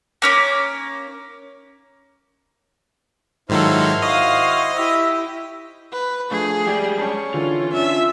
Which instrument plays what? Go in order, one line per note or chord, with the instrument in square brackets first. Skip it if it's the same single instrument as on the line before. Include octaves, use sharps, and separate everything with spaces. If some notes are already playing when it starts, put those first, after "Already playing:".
[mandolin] A#3 C#4 D6
[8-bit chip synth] G#2 D#3 F#3 [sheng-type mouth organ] E4 C5 F6 [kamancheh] F4 A4
[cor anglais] F#4 [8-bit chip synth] D#5 [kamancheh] F5 D#6
[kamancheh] E4 G4 [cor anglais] E5
[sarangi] B4
[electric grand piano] F3 A3 D4 [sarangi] G#4
[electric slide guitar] G3 G#3 D5 [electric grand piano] G4 G5
[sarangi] C#4 [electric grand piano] A5
[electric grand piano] D3 E3 [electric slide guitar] F4
[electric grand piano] C#4 D4 [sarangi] E5